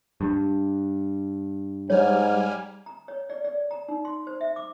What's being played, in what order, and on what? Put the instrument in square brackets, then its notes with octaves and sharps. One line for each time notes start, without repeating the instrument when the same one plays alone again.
[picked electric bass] G2
[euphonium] G#2 [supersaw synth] G3 G#5 F6 [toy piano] C#5
[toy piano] A#5
C#5
D5
D5
A#5
D#4
C6
C5
E5
D6